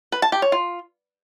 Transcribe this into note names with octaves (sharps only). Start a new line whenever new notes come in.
B4
A5
G4
C#5
F4